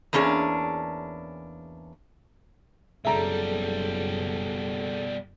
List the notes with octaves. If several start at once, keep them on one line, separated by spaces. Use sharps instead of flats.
E2 A#3 C#4 D4 G#4
F#1 B2 G3 G#4 A4 E5 A5 A#5